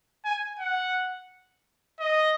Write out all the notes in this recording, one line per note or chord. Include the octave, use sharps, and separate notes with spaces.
G#5
F#5
D#5